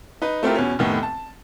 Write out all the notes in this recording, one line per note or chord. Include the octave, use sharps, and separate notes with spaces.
D#4 B4
A3 C4 E4 F4 G4 A#4
E2 B2 C#4
F1 A2 D#3 B3
A5